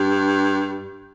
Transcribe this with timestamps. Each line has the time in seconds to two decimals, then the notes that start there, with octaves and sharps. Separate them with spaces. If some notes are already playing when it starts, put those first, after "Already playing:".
Already playing: G2